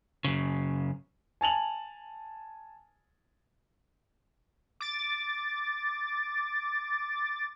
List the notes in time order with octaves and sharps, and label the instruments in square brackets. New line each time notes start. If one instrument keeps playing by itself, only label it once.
[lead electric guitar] F#2 C#3
[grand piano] G#5 A5 F7 F#7
[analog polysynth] D6 A6